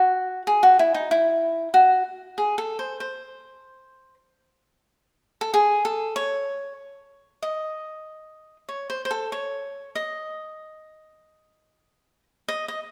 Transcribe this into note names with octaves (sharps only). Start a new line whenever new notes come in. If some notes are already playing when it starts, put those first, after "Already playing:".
Already playing: F#4
G#4
F#4
E4
D#4
E4
F#4
G#4
A4
C5
C5
A4
G#4
A4
C#5
D#5
C#5
C5
C5
A4
C#5
D#5
D#5
D#5